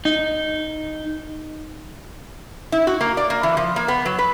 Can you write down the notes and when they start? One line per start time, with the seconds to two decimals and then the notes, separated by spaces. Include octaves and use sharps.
0.05 D#4
2.72 E4
2.87 F#4
3.01 A#3
3.17 D5
3.30 A#3
3.43 E3
3.57 F3
3.76 A#3
3.88 B3
4.06 F#3
4.19 B4